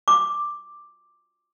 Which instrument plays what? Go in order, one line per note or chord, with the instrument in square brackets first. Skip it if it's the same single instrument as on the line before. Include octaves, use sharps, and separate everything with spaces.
[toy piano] D6